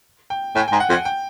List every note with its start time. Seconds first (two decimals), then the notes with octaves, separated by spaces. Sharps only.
0.30 G5
0.55 A2 G#5
0.68 G#2 G5
0.80 F#5
0.89 F2
0.93 F#5
1.05 G5